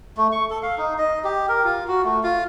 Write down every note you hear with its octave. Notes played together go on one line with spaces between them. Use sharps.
A3
C#6
A4
F5
D#4
D#5
G4
A#4
F4
F#4
A3
F4